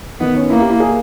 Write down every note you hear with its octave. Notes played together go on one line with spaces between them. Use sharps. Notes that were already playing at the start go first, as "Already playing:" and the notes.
D#3 B3
C#4
A#3 E4
G4
E4
G#4